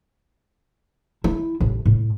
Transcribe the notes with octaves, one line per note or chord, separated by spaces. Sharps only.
E4
A1
A2